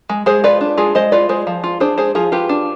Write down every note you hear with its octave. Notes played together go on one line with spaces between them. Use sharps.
G#3
G#3 G#4 C5
F4 B4 D5
D4
G#3 F4 G#4
G#3 C5 D#5
F4 B4 D5
G#3 G#4 C5
F3
F4
D4 G#4 C5
G#3 G#4 C5
F3 F4 G#4
F4 G4 B4
D4